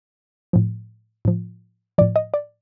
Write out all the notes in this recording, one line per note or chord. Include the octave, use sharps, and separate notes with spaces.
A2 F3
A2 F3
A2 F3 D5
D#5
D5